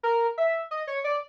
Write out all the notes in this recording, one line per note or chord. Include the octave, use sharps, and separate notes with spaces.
A#4
E5
D#5
C#5
D5